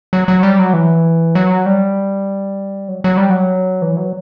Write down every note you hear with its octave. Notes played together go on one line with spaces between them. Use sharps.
F#3
F#3
G3
F#3
E3
F#3
G3
F#3
F#3
G3
F#3
E3
F#3